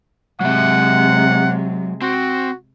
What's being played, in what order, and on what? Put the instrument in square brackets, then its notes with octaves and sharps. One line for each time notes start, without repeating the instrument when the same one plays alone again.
[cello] C3 G#3 [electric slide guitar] F#3 E5 [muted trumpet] F#5
[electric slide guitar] C4 [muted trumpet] F#4